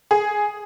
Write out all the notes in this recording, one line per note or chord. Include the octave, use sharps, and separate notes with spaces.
G#4